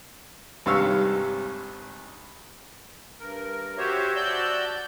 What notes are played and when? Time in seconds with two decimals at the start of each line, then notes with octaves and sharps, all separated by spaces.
0.66 G#1 G2 C3 C#5 F5 E6
3.20 G2 A#4
3.78 F#4 G4 C5 C#5 E5
4.16 F#4 D5 A5 E6 G6